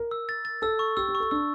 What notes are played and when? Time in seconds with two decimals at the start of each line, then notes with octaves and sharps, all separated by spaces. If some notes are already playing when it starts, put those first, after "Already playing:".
Already playing: A#4
0.11 E6
0.29 A6
0.45 A6
0.62 A4 E6
0.79 C#6
0.97 G4 E6
1.09 G4
1.15 C#6
1.20 A4
1.31 D4 E6